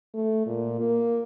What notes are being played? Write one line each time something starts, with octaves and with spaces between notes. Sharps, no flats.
A3
A#2
A#3